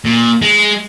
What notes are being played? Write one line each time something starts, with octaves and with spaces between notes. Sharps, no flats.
A#2
G#3